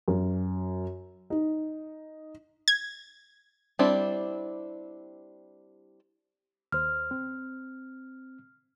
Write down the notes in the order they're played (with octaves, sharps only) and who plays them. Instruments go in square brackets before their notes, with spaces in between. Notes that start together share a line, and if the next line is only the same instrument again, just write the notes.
[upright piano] F#2
D#4
[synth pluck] G#6
[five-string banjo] G3 C4 D4 E4
[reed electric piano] D#2 C5 [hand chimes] F6
[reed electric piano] C4